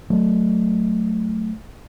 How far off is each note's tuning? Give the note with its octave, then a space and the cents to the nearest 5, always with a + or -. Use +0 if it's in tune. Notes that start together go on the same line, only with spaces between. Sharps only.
F#3 +0 A3 +0